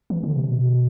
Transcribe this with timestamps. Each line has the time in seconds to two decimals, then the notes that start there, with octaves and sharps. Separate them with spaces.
0.10 E3
0.24 D3
0.36 C3
0.50 B2